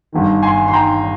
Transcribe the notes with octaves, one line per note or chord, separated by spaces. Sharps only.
G1 G2 D#3
G#5 C6
C6
G5 A#5